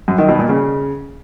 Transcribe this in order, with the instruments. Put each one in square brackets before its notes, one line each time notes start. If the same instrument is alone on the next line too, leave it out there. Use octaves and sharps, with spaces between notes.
[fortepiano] F#2
D#3
B2
A#2
C#3